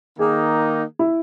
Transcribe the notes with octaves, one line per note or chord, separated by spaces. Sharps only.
D#3 A#3 D#4 G#4
E4